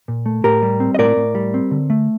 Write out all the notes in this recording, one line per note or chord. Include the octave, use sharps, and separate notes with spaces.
A#2
A3
A2 G4 A#4
G3
C4
D#5
A2 A#4 D5
A2
G3
C4
D3
A3